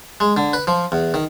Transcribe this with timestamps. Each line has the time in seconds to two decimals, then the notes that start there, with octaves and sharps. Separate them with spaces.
0.20 G#3
0.37 D3
0.53 B4
0.67 F3
0.92 E2
1.14 D#3